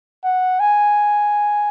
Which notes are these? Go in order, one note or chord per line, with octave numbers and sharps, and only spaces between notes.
F#5
G#5